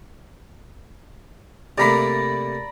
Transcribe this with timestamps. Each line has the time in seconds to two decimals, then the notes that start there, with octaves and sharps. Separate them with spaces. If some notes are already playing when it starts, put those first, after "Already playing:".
1.78 C3 A3 A#3 D5 A#5 B5